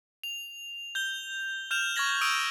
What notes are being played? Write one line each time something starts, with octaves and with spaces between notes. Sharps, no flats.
F7
G6 G7
F6 G6 E7 F7
C#6 F6 G#6 A#6 F#7
C#6 D#6 E6 D7 D#7 F7